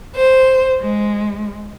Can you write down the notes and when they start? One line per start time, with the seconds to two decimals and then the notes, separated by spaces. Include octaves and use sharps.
0.17 C5
0.81 G#3